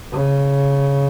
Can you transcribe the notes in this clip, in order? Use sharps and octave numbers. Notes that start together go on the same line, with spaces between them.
C#3